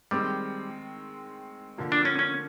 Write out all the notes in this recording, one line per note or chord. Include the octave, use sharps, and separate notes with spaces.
D#3 G3 G#3 C4
D3 F3 A#3
D4
C#4
C#4